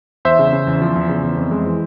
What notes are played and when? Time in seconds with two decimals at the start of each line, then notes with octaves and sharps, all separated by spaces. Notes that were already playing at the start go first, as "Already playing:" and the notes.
0.25 E2 C5 E5
0.39 C#3
0.53 C#3
0.67 E2
0.81 F3
0.96 E2
1.09 C#3
1.23 E2
1.37 F2
1.51 G#3
1.66 E3